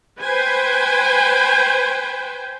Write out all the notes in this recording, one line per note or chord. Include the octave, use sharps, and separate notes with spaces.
B4 C5 G5 G#5